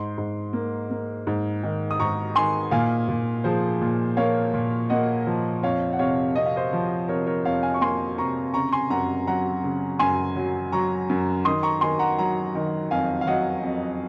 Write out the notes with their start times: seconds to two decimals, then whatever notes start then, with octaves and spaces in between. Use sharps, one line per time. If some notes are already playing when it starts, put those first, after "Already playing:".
Already playing: G#2 C6
0.18 G#2
0.53 A#3
0.90 A#3
1.27 G#2
1.63 D#3
1.91 D#6
2.00 G#2 A#5 C#6
2.35 D#3 G#5 C6
2.71 A#2 F5 G#5
3.08 A#2
3.44 F3 G#4 C5
3.81 A#2
4.17 A#3 C#5 F5
4.53 A#2
4.90 A#3 D#5 F#5
5.27 F3
5.63 F2 C#5 F5
5.93 F#5
5.99 C3 C#5 F5
6.36 C3 D#5
6.46 F5
6.56 C5 D#5
6.73 F3
7.08 C3 A#4 C#5
7.27 A#4 C#5
7.45 F2 C#5 F5
7.63 F5 G#5
7.74 C#6
7.81 A#3 G#5 C6
8.18 C3 A#5 C#6
8.54 C#3 A#5 C#6
8.72 G#5 C6
8.90 F#2 F#5 A#5
9.27 F#3 F#5 A#5
9.64 C#3
9.99 F#2 G#5 C6
10.36 F#3
10.72 F#3 A#5 C#6
11.10 F#2
11.45 D#3 C6 D#6
11.63 A#5 C#6
11.81 D#3 G#5 C6
11.99 F#5 A#5
12.18 F#3 F#5 A#5
12.55 D#3
12.91 F2 F5 G#5
13.21 F5
13.27 F#3 D#5 F#5
13.63 F2